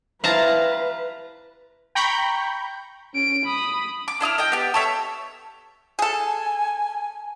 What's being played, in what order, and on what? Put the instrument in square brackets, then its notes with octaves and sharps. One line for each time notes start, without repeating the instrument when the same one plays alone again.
[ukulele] E4 G4 C5 [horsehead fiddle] B4 [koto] F5 A5 A#5
[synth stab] G5 A#5 B5 C#6 G6
[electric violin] C#4 D7
B5 D#6
[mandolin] D6
D4 E4 D#6 F6
D#5 G5
B3 G4
A4 C#5 E5
[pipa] G#4 A4 [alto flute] G#5